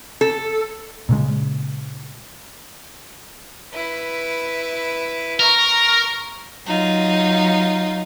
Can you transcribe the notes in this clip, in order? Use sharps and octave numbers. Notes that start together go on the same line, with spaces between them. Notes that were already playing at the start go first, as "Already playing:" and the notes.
A4
A#2 C#3 G#3
E4 B4
A#4 A#5 C#6
F#3 D#4 F4